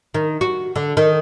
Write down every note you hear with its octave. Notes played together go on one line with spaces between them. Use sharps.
D#3
F#4
D3
D#3